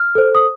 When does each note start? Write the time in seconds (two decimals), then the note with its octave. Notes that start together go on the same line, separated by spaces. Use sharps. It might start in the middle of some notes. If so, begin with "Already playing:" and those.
Already playing: F6
0.15 A4 C5
0.35 D#6